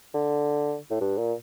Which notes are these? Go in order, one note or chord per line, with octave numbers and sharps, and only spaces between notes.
D3
A2
G2
A#2